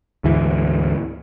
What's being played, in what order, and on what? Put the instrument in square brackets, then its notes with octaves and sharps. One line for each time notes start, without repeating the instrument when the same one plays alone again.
[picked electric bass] D2 G#2 E3